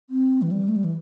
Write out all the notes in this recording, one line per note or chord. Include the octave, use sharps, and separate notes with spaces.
C4
E3
G3
A3
G3
E3